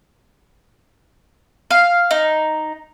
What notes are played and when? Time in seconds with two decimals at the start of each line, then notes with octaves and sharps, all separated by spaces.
1.71 F5
2.11 D#4